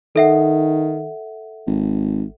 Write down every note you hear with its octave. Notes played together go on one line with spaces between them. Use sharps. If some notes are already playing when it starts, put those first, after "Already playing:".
D#3 A4 E5 F#5
G#1